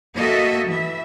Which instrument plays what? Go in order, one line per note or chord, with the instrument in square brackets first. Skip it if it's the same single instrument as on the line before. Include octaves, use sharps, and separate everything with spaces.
[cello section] A#3 F#4 A4 D#5 E5
E3 E5